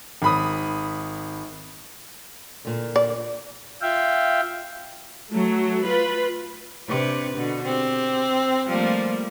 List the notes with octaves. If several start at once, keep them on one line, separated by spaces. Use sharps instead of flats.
G#1 B5 D#6
A#2 D3
D5
F4 E5 F5 G5
F#3 A3
F4 B4
C3 D4 B4
B2 D3
C4 G4
F3 G3 A3 A#3